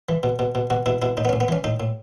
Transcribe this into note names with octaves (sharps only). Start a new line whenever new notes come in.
E3
B2
B2
B2
B2 F#4
B2 E4
B2 E4
A2 D#4
B3
A2 C#4
B3
E3 C#4
A2 D#4
A2